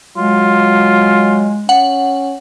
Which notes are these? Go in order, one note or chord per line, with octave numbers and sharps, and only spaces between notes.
F#3 G#3 F4
C#4 F#5